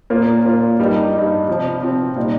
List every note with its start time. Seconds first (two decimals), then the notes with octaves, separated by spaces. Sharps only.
0.10 A#2 A#3 F4
0.45 A#2 A#3 F4
0.79 G2 G3 D#4
1.13 G2 G3 D#4
1.48 C3 F3 C4
1.82 C3 F3 C4
2.16 A#2 G3 D#4